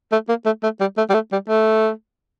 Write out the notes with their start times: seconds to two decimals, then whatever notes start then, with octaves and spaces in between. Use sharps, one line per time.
0.12 A3
0.29 A#3
0.45 A3
0.63 A3
0.80 G3
0.97 A3
1.10 G3
1.14 A3
1.32 G3
1.48 A3